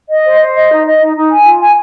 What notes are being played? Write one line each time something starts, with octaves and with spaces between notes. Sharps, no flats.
D#5
C5
C5
D#5
D#4
D#5
D#4
D#4
G#5
F4
G#5